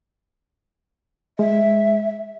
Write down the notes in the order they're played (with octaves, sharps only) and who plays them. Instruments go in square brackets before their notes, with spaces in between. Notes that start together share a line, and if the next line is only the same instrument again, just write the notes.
[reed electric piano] G#3 [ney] E5